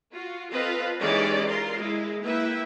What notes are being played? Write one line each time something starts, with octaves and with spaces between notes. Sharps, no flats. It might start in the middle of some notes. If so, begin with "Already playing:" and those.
F4 F#4
C4 F4 A4 B4 D#5 F5
E3 G#3 C#4 D#4 G4 D5
F4 A#4 C6
G#3 E4
A#3 E4 B4 E5 G5